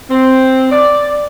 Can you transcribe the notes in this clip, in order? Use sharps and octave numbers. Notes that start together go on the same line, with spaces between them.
C4
D5